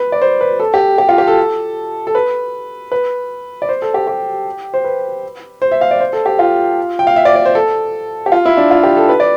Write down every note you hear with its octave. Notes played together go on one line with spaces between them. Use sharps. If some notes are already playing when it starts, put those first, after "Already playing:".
Already playing: B4
D5
C5
B4
A4
G4
G4
F4
G4
A4
A4
B4
B4
D5
C5
A4
G4
G4
C5
B4
C5
E5
F5
D5
C5
A4
G4
F4
G5
F5
E5
D5
D5
C5
A4
G4
F4
E4
D4
F4
G4
A4
B4
D5